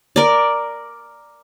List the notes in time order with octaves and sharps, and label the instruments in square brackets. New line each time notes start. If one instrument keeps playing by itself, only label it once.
[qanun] A#4 D5